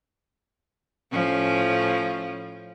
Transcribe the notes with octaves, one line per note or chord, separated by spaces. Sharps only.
A2 F3 C#4